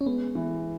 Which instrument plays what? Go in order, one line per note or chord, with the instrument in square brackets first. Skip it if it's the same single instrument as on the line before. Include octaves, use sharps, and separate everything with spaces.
[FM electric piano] C#4
[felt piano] G#3 [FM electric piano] B3
[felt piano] E3